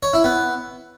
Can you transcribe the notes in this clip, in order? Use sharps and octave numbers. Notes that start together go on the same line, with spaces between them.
C#5
E4
B3